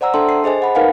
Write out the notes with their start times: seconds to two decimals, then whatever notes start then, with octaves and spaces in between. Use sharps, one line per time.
0.01 C5 D5 F#5 A#5 E6
0.14 D4 A4 E5 G5 A5 C6
0.29 C7
0.44 G#4 C5 D#5 G#5
0.62 F#5 B5
0.75 D#4 A#4 B4 F5 F#5 G#5